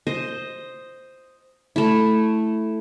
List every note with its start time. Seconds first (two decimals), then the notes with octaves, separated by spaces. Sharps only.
0.07 C5 D#5
1.76 A3 E4